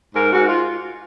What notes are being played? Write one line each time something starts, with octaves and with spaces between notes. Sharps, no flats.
G#2 A#4
G#2 F#4
F4